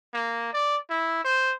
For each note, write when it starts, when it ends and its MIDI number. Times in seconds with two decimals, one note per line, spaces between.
0.13 0.50 58
0.53 0.77 74
0.90 1.21 64
1.24 1.53 72